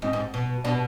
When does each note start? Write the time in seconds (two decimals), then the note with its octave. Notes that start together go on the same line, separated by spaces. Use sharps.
0.02 G#2 C4 D#4
0.13 G#2
0.34 B2
0.64 B2 B3 D4